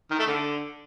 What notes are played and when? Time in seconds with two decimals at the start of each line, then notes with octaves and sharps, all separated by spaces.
0.10 D#3
0.19 A3
0.27 D3